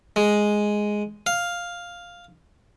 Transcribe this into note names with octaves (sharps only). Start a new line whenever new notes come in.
G#3
F5